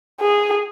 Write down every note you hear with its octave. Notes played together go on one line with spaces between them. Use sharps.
G#4